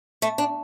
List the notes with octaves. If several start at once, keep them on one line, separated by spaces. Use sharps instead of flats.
A3
D4